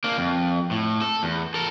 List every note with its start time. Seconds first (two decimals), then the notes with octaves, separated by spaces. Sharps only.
0.04 A#3 D4
0.18 F2
0.71 A2
1.01 A4
1.23 E2
1.54 A4 A#4